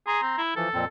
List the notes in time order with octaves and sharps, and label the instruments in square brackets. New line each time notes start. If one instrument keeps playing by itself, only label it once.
[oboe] G#4 [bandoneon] A#5 C6
[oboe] C4
E4
[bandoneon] E3 F3 [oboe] A4
[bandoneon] F2 A#2 C4